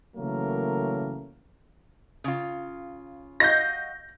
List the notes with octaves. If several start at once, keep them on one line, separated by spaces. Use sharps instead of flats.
C#3 E3 F#3 A3 A#3 A#4
C#3 F4
F#4 D#5 F5 G6 A#6